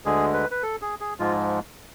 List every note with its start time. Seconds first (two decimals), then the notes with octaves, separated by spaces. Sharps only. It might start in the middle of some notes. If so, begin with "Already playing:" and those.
0.05 D2 D3 G#3 G#4
0.34 B4
0.51 B4
0.63 A4
0.82 G#4
1.00 G#4
1.19 G#2 F3 G#3 F4